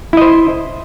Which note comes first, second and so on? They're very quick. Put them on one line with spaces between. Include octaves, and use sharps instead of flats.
E4 D#5 C5